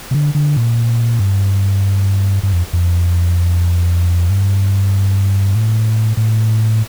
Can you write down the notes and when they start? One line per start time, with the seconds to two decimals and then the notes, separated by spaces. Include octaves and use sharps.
0.11 C3
0.14 D3
0.35 D3
0.56 A#2
1.19 G2
2.43 G2
2.53 F2
2.73 F2
4.30 G2
5.55 A2
6.17 A2